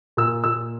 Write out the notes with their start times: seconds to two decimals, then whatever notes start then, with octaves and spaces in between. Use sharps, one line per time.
0.17 A#2 E6
0.44 A#2 E6